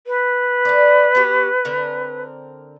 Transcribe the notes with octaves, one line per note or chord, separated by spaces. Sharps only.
B4
A3 D5
B3 F#4 G4
D3 C4 A#4